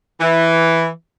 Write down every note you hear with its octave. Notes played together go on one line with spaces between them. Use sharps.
E3